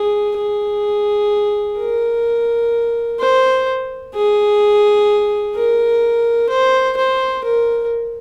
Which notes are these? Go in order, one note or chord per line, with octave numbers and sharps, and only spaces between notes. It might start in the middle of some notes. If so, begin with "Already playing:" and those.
Already playing: G#4
G#4
A#4
C5
G#4
A#4
C5
C5
A#4